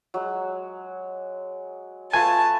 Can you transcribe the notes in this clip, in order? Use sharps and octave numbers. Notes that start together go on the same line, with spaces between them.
F#3 G#3
A3 F4 B4 G#5 A5